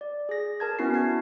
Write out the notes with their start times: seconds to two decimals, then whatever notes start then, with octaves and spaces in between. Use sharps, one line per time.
0.01 D5
0.29 G#4 A#6
0.60 A#4 A5 G#6
0.79 B3 C#4 E4 F#4 A5 C7
0.94 G#6 C7